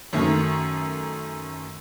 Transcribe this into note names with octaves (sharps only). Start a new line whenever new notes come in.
F#2 D#3 A3